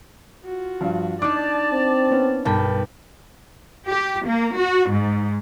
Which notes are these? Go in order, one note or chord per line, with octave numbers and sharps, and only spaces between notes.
F4 F#4
G2 F3
D4 D#4 D5 A5 D6
C4
B3 C#4
B1 G2 A#4 B4 G5 A5
G4
A#3
F#4
G#2